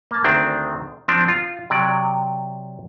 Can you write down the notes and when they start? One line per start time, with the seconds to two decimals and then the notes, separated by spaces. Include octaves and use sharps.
0.11 A#3 A5
0.24 D2 D#3 C4 D4
1.08 F3 C4 D4
1.28 F4
1.70 C3 F#3 D5